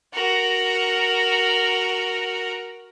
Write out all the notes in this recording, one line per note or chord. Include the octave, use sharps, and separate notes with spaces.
F#4 A#4